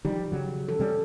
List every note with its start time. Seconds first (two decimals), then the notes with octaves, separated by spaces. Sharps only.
0.05 D#3 F3 G3 G4
0.32 C#3 F#3
0.68 E3 A4
0.79 C3 G3 C#4